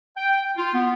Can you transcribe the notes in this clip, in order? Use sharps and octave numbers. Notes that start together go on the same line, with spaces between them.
G5
F4
B3